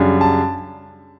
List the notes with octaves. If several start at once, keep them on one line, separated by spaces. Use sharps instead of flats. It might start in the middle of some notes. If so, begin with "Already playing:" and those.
Already playing: F#2 C#3 G3 D4
A5